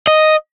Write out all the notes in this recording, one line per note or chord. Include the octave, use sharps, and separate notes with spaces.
D#5